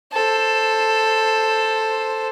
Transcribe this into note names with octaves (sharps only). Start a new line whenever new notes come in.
A4 C5